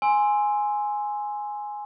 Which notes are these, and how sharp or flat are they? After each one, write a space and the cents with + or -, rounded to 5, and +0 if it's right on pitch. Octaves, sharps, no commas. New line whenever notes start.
G#5 +0 C6 +0 E6 +0